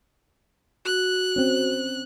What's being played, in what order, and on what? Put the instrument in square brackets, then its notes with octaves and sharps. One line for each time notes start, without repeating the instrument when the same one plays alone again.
[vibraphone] F#4 [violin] F#6
[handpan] C4 C#4